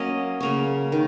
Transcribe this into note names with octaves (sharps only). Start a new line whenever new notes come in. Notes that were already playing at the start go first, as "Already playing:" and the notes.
Already playing: F#3 A#3 C#4 D#5
C#3 A#3 C#4
D#3